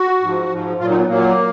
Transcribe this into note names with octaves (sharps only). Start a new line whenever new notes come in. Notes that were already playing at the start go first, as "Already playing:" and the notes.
Already playing: F#4
G#2 F3
G#2 F3
A#2 F#3 F4
D#4
B3
A#2 F#3 A#3